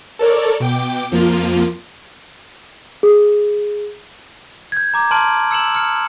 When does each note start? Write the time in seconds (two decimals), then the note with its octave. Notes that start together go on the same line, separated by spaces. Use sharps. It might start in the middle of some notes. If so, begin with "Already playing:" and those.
0.19 A4 A#4 C#5 D5
0.60 B2 G5 D6
1.12 F2 F3 A#3 F4
3.03 G#4
4.72 G6 G#6
4.94 A#5 D6 G#6
5.11 A5 C6 F6 D7 F#7
5.51 E6 C#7 E7 F#7
5.75 F6 C#7